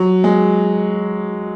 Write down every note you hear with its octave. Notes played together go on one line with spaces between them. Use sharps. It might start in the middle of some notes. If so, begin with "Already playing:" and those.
Already playing: F#3
G#3